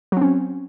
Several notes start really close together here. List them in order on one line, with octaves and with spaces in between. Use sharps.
F#3 C4 C#4